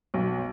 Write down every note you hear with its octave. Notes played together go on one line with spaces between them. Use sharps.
B1